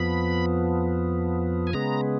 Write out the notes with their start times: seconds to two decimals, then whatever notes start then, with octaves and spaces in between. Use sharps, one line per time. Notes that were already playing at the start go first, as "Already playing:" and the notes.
Already playing: F2 F3 B3 B5
1.67 G#5
1.73 C#3 G#3 B3 A#5